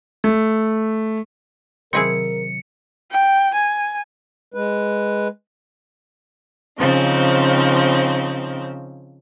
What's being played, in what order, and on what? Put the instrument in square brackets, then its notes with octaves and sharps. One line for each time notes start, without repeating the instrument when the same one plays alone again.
[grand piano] A3
[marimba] C3 D#3 F#3 [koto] C4 E4 G#4 [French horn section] A#4 [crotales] C#7
[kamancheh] G5
G#5
[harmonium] G#3 B4
[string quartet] C#3 F3 C4 D#4